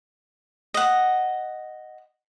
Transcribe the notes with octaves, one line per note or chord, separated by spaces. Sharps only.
D#5 F#5